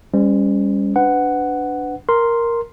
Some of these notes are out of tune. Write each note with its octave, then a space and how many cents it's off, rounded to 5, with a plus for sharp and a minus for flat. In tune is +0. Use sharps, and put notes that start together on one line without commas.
G3 +35 C#4 +0 C5 -30
D4 -5 B4 +30 F#5 +5
A#4 +0 C6 +0